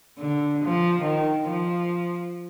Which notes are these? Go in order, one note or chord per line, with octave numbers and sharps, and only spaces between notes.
D3
F3
D#3
F3